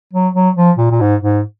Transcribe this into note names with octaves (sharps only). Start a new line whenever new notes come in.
F#3
F#3
F3
A#2
A#2
G#2
G#2